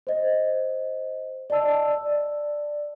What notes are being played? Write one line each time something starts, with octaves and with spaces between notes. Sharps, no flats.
C5 D#5
D5 D#5 A5 E6
D5